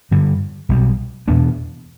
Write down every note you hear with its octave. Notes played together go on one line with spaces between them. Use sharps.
G2 D3 G3
B1 B2 G3
E2 B2 B3 D4